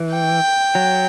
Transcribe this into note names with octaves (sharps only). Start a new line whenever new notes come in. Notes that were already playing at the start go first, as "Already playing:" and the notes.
Already playing: E3
G5
F#3